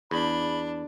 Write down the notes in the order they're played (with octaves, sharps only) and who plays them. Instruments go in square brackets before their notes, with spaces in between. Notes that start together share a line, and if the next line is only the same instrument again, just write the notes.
[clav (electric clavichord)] E2 [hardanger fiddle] D4 [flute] B5